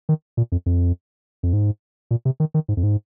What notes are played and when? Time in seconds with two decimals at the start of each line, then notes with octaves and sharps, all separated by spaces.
0.09 D#3
0.37 A#2
0.52 F2
0.66 F2
1.43 F2
1.53 G#2
2.11 A#2
2.25 C3
2.40 D#3
2.54 D#3
2.68 G#2
2.77 F2
2.83 G#2